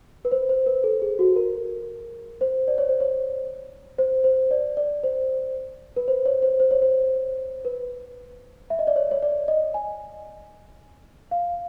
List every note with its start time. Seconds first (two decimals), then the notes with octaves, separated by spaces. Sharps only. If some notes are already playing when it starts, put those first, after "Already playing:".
0.25 B4
0.32 C5
0.49 C5
0.66 B4
0.84 A4
1.02 G#4
1.19 F#4
1.36 A#4
2.41 C5
2.68 D5
2.78 C#5
2.89 C5
3.00 C#5
3.98 C5
4.24 C5
4.51 D5
4.77 D5
5.04 C5
5.96 B4
6.08 C5
6.25 C#5
6.42 C5
6.60 C5
6.71 C#5
6.82 C5
7.65 B4
8.70 E5
8.79 D#5
8.87 D5
8.96 C#5
9.11 C#5
9.22 D5
9.48 D#5
9.74 G#5
11.31 F5